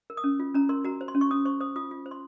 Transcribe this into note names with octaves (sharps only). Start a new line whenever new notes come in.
A#4
D#6
C#4
F4
C#4 A#5
A#4 C6
F#4 A#5
C5
C6
C#4
C#6
C#4 D#6
C5 C#6
C5 D#6
F4 D#6
F4
C5
C6